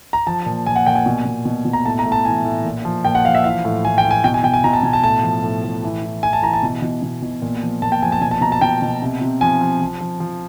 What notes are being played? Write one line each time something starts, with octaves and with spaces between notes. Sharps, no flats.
A#5
F3 A5
A#2
A#2 G#5
F#5
A#2 G5
G#5
B2
B2
B2
B2
A#5
A2 A5
A#5
A2
A5
E3 G#5
A2
A#2
F3
A#2 G5
F#5
F3 F5
E5
E3 F5
A2
A2 G#5
G5
E3
G#5
B2 G5
G#5
B2 G5
G#5
B2 A#5
A5
B2 G#5
A5
A2 A5
F3
A2
A2
E3
E3
E3 G#5
A5
E3 A#5
A5
B2
B2
B2
B2
A#2
F3
A#2 A5
G5
F3 G#5
A5
B2 G#5
A5
B2 A#5
A5
B2 G5
B2
C3
C3
F3 G#5
F3
F3
F3
F3